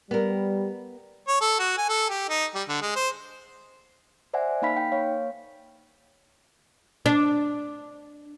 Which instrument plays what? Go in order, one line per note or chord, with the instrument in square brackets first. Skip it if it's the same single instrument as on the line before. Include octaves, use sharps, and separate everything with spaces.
[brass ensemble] G3 [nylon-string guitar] B3 A#4
[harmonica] C#5
A4
F#4
G#5
A4
G4
D#4
G3
D3
G#3
C5
[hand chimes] C5 D5 E5 F#5 G#5
A#3 D#4 F5 B5 B6
D#4 G5
A#3 C#5 F5
[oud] D4